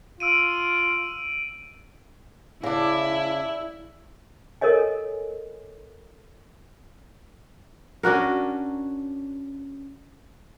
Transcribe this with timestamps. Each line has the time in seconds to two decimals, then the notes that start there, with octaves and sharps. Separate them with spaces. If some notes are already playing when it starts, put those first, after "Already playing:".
0.20 F4 E6 D7 D#7
2.63 C#3 D4 E4
4.61 A4 A#4 C#5 D#5 G#5
8.03 C#4 D4 F#4 A#4